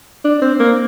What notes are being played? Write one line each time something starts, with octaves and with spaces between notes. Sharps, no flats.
D4
C4
A#3